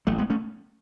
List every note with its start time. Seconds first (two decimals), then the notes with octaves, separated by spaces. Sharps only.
0.07 A1 F#3 A3
0.18 G#3 B3
0.30 A3 C#4